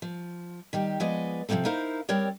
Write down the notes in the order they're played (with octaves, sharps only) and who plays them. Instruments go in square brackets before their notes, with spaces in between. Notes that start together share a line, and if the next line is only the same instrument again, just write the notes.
[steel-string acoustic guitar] F3
D#3 G3 G4
F3 G#3 B3 D5 D#5
C3 F3 F#3 A#3 C4 A4
D#4 E4 A#4 C5 F5
G3 C4 A#4 C#5 D5